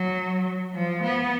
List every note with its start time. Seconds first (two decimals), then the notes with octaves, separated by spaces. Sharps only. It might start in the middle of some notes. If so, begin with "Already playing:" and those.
Already playing: F#3
0.74 F3
1.04 B3